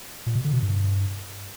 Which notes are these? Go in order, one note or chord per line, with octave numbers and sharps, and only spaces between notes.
A#2
B2
D3
B2
G2